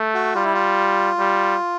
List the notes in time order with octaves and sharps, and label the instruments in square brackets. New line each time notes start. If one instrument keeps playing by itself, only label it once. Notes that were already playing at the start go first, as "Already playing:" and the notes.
Already playing: [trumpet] A3
[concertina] F#4
[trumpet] G3 [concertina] F4
[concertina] E4
F4
[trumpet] G3